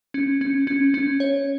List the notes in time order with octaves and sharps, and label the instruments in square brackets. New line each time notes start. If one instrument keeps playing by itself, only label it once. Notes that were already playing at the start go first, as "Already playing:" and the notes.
[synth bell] C#4
C#4
C#4
C#4
C#5